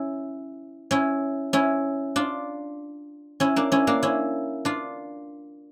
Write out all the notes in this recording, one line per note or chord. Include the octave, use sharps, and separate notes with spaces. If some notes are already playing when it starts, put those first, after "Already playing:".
Already playing: C#4 E4
C#4 E4
C#4 E4
D4 F4
C#4 E4
A#3 D4
C#4 E4
A#3 D4
C#4 E4
D4 F4